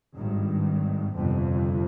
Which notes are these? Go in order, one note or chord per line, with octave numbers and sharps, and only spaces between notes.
G#1 G2 D#3
G1 F2 C3